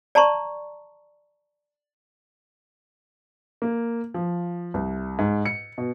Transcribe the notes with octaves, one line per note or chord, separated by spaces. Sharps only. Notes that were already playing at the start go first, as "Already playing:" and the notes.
D5 A5 A#5 C6 C#6
A#3
F3
C2
G#2
C#7
B2